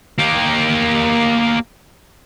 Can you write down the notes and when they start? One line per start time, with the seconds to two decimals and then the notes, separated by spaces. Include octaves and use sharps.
0.18 A#3 G4